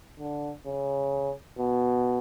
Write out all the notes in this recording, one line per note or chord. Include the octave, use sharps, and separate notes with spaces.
D3
C#3
B2